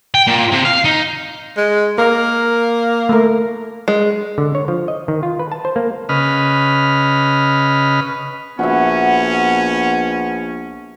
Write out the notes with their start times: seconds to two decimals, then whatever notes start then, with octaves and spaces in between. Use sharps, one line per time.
0.14 G5
0.27 A#2
0.52 C3
0.65 F5
0.85 D#4
1.57 G#3
1.98 A#3 A#4
3.09 A3 A#4
3.88 G#3
4.38 D3
4.55 C#5
4.68 F3
4.88 D#5
5.08 D#3
5.23 F4
5.39 B4
5.52 A5
5.65 C5
5.76 A#3
6.09 C#3 B4 D#5 F6
8.59 A#1 B3 C#4 F#4 E5